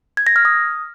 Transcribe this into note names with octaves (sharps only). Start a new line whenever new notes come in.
G#6
A#6
F6
D#6